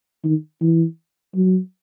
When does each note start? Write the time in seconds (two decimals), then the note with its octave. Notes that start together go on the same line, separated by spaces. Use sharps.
0.24 D#3
0.61 E3
1.35 F#3